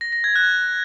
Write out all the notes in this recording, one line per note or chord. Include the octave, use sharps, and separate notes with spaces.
A#6
A#6
G#6
F#6